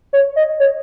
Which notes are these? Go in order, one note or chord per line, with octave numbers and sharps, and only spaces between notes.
C#5
D#5
C#5